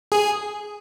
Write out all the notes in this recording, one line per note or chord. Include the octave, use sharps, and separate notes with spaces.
G#4